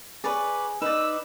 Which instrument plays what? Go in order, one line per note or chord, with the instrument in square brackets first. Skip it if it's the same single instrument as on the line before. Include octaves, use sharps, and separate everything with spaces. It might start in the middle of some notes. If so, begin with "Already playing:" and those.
[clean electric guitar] G#4 [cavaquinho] B4 C#5 D5
[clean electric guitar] D#4 [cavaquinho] B4 D5 [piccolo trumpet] E6